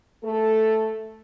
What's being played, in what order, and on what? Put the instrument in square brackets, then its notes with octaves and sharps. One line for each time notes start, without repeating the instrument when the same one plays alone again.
[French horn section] A3 A4